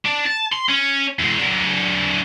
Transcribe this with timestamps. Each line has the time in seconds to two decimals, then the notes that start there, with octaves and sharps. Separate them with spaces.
0.05 D4
0.26 A5
0.52 C6
0.69 C#4
1.19 E2 G#3
1.39 F#3 D4